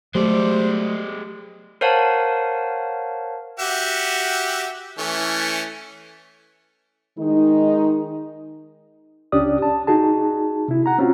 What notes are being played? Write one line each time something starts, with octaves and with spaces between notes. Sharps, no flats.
F#3 G#3 A3 G4 C5 D5
A#4 C5 C#5 F5 F#5 A5
F#4 G4 E5
E3 A3 C#4
D#3 G#3 D#4
C#2 C#4 D4 G4 D5 D#6
A5
D#4 F#4 G#4 A5
C3 E4
F#5 A#5
C4 C#4 F4 F#4